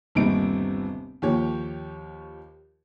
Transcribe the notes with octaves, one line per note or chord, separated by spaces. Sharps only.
G1 D#2 C3 G3 D#4 D7
D#2 F3 G4 C#5